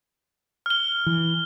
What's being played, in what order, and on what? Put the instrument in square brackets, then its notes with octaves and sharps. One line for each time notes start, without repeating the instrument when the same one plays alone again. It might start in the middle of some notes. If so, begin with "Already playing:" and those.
[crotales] F6 G7
[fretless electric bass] E3